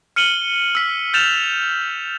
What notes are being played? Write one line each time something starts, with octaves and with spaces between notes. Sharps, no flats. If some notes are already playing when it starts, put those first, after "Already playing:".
F6 C#7 D#7 F#7 G7
E6 B6
F6 G6 A6 E7 F7